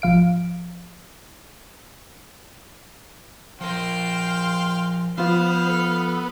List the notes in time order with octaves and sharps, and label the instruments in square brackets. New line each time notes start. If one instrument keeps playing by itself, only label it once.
[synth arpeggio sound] G#1 F3 F5 D7
[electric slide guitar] F3 A#4 [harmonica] C5 F5 G5
[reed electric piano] F3 F4 [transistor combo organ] B3 [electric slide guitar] C5 [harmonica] F5
[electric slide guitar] A4